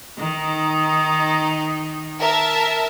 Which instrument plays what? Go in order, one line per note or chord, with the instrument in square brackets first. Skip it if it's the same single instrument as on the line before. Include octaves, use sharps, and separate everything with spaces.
[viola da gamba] D#3 D#4
[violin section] A#4 E5 A5